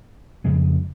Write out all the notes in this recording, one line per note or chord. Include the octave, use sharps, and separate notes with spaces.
F2 C#3 G#3 C#4